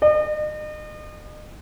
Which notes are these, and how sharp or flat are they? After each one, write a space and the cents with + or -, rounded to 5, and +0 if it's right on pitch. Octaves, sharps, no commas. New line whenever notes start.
D#5 -40